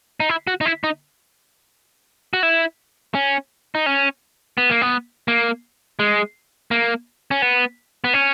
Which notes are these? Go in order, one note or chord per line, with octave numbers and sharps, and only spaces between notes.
D#4
E4
F#4
D#4
E4
D#4
F#4
E4
C#4
D#4
C#4
B3
A#3
B3
A#3
G#3
A#3
C#4
B3
B3
C#4